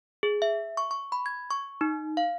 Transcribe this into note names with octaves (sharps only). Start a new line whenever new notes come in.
G#4
E5
C#6
C#6
B5
G#6
C#6
D#4
F5